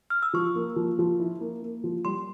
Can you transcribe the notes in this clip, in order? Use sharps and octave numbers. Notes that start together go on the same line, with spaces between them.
F6
E6
F3 C#6
A#3
F3
F3
E4
A#3
A#3
F3
G3 C6